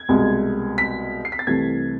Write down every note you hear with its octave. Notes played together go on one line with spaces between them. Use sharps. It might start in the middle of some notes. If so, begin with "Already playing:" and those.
Already playing: G#6
C2 B2 G#3
B6
C7
B6
A6
C2 C3 E3 A3 G#6